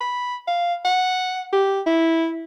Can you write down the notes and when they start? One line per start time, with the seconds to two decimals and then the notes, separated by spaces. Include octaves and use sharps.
0.01 B5
0.47 F5
0.85 F#5
1.53 G4
1.86 E4